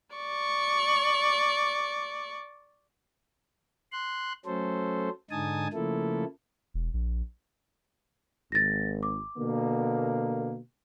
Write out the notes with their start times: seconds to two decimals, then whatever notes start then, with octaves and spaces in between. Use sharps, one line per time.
0.15 D5 C#6
3.92 C6 F#6
4.46 F#3 A3 C#4 A4 C5
5.31 G#2 D3 D#4 G#5 A5 D#6
5.73 C#3 F3 A3 A#3 E4 A4
6.74 E1
6.93 A#1
8.52 G#1 A6 A#6
9.03 D6
9.38 B2 D3 A#3